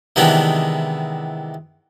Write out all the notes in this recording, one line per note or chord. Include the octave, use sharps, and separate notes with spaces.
C3 D#3 E3 G#3 B3 D4